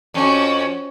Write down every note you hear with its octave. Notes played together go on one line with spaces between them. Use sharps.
F2 C#4 F#4